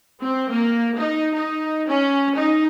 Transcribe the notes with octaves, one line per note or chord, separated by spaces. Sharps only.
C4
A#3
D#4
D#4
C#4
D#4